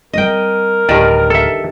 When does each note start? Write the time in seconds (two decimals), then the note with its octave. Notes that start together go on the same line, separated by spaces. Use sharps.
0.13 G3 B3 C4 A#4 D#5 G5
0.89 D1 D2 G2 D#3 D5
1.30 A4 E5